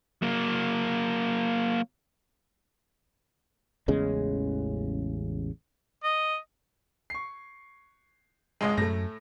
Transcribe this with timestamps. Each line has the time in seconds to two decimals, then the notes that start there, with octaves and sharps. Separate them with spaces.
0.22 F#3 A#3
3.88 A1 E2 C#3 G#3
6.04 D#5
7.10 C#6 C7
8.61 G#1 C#2 G#3 D#5
8.78 F#2 A2 A3 A#6